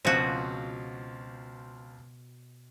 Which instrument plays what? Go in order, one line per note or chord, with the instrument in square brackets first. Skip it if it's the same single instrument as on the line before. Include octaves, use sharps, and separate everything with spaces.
[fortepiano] C#2 F3 C4 [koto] B2 F#4